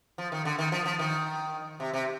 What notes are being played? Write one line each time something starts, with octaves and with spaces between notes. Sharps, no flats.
F3
D#3
D3
D#3
F3
F3
D#3
C3
C3